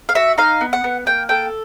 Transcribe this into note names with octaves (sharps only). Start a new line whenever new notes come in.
F5
F#4 E5
D#4 F5
B3
F#5
B3
A#3 G5
A4 G5